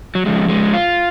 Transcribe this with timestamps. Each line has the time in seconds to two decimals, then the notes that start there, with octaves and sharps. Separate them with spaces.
0.15 F#3
0.26 F2 C#3 F3 G#3
0.49 G#3
0.73 F4